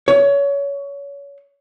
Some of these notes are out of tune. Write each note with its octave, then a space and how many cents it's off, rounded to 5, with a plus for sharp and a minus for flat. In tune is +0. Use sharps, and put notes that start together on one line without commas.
C#5 +25